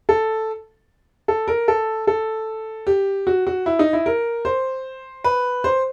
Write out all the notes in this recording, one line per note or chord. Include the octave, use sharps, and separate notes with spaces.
A4
A4
A#4
A4
A4
G4
F#4
F#4
E4
D#4
E4
A#4
C5
B4
C5